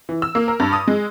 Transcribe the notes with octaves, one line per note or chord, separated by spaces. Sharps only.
E3
E6
A#3
A#4
G2
D#6
G#3